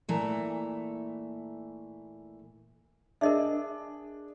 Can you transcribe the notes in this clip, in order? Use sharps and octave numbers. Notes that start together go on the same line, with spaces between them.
A#2 E3 A3 A#5
D4 G#4 A#4 D#5 E5